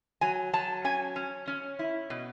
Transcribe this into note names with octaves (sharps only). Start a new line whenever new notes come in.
F#3 G#5
F#3 A5
C#4 G#5
C#4
C#4
E4
B2